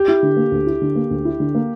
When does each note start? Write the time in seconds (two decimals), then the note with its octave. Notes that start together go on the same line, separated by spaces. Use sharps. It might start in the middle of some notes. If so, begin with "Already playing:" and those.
Already playing: G4
0.08 E4
0.23 D3
0.37 A#3
0.52 D2
0.67 E4
0.82 D3
0.96 A#3
1.11 D2
1.25 E4
1.40 D3
1.55 A#3